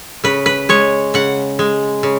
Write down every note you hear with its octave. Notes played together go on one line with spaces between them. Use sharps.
C#3 B4
B4
G#3 C#5
C#3 F#5
G#3
C#3